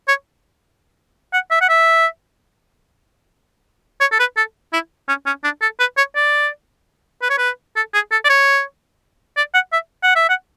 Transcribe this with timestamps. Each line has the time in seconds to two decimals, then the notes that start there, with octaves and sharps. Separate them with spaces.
0.08 C#5
1.33 F#5
1.51 E5
1.61 F#5
1.69 E5
4.00 C#5
4.12 A4
4.19 B4
4.37 A4
4.73 E4
5.08 C#4
5.26 C#4
5.44 D4
5.62 A4
5.80 B4
5.97 C#5
6.15 D5
7.22 B4
7.30 C#5
7.38 B4
7.76 A4
7.94 G#4
8.12 A4
8.24 D5
8.29 C#5
9.37 D5
9.54 F#5
9.73 E5
10.03 F#5
10.16 E5
10.29 F#5